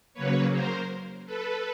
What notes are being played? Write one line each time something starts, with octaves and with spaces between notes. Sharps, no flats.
C#3 F#3 A#3 B4 C#5
A#4 C5
A4 B4